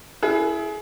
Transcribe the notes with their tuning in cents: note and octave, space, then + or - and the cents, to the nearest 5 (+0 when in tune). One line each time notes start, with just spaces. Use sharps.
E4 +5 G#4 +25